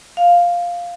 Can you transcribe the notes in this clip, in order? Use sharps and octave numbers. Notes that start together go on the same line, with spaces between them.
F5